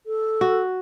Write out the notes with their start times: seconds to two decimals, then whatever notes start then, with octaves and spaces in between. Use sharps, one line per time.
0.06 A4
0.41 F#4